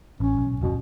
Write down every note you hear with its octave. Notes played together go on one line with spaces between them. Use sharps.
A1 C#4
B1
D#1 F#2 B2 C#4